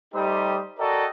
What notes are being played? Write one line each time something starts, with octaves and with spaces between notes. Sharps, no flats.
G3 A3 D#4 G4 C5 D#6
F#4 A4 A#4 D5 D#5 G5